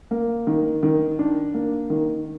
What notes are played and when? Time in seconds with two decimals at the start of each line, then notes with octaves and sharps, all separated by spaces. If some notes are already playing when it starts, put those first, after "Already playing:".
0.11 A#3
0.47 D#3
0.83 D#3
1.19 D4
1.54 A#3
1.90 D#3